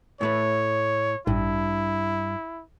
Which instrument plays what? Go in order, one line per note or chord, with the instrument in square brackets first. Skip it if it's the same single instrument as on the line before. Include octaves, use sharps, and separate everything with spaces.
[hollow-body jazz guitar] A2 A3 B4 [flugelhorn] C#5
[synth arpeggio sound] A1 [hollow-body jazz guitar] G2 [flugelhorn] E4